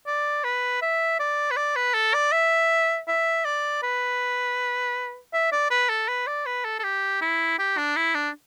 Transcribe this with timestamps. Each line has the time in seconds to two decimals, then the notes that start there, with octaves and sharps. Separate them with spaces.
0.07 D5
0.44 B4
0.82 E5
1.20 D5
1.51 B4
1.57 D5
1.76 B4
1.94 A4
2.14 D5
2.32 E5
3.08 E5
3.45 D5
3.83 B4
5.33 E5
5.52 D5
5.71 B4
5.89 A4
6.08 B4
6.27 D5
6.46 B4
6.65 A4
6.79 A4
6.84 G4
7.21 E4
7.59 G4
7.77 D4
7.96 E4
8.15 D4